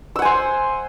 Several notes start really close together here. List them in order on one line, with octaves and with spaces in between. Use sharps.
E6 F#5 G#5 C5